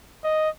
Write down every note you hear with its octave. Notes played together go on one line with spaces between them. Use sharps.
D#5